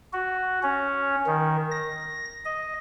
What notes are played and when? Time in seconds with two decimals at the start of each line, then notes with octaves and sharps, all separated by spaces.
0.13 F#4
0.63 C#4
1.27 D#3
1.71 A#6
2.45 D#5